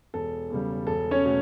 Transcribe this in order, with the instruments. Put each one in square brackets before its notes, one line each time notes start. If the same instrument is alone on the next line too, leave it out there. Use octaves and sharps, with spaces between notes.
[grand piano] E1 A4
E2 C#3 G3
E1 A4
C#4 C#5
B2 A3